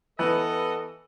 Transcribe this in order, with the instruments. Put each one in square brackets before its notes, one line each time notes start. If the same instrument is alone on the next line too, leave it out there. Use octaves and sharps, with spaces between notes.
[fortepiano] E3 [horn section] B3 B4 D#5 [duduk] A4